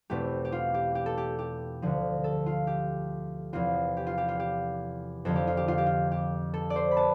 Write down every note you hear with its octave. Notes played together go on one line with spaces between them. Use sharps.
E2 B2 A3 C4 G4
G4
F4
G4
G4
A4
G4
G4
D2 D3 F3
A4
F4
G4
E2 C3 F3 C4 F4
G4
F4
G4
F4
G4
F2 D3 F3 A4
G4
F4
G4
F4
G4
F4
G4
A4
D5
C5
B5
B3 A5